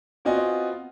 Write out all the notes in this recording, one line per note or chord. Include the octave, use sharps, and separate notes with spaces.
B3 C4 F4 F#4 D#5 G#5